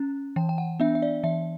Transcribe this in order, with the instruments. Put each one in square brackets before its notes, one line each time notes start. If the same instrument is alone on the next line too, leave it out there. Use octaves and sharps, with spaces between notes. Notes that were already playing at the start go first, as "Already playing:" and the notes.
Already playing: [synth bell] C#4
E3 G5
G5
F#5
B3 D4 E5
E5
D5
E3 E5